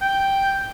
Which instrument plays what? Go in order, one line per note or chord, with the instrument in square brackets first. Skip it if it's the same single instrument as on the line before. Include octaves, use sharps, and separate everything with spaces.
[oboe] G5